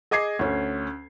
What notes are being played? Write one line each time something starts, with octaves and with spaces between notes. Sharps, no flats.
G#4 D#5 D6 G#6 C7
D2 C#4